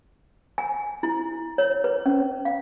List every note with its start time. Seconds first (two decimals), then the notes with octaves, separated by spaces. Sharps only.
0.58 G#5
1.03 E4
1.58 C#5
1.84 B4
2.06 C#4
2.45 F5